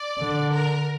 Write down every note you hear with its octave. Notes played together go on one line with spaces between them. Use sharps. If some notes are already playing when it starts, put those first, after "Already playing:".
Already playing: D5
D3
A#4